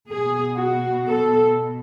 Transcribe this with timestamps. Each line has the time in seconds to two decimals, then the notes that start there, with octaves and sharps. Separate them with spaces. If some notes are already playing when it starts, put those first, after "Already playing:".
0.11 B2 G#4
0.58 F#4
1.06 A4